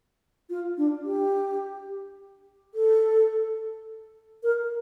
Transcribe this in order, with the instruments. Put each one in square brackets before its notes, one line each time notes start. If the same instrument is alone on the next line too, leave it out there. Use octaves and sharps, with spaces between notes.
[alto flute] F4
D4
G4
A4
A#4